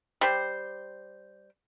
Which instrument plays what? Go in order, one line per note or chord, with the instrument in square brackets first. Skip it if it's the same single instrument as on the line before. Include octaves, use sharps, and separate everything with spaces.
[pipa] G3 C5